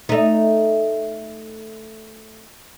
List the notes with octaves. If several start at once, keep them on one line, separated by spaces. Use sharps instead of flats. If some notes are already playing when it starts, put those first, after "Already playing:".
A3 D#4